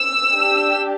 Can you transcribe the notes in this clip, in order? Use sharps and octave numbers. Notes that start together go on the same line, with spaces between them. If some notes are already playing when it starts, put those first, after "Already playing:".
Already playing: E6
D4 G4